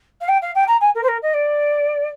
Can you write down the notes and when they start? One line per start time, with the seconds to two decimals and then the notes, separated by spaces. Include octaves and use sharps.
0.21 F5
0.28 G5
0.42 F5
0.55 G5
0.68 A#5
0.81 G#5
0.95 A#4
1.03 C5
1.08 A#4
1.22 D#5
1.34 D5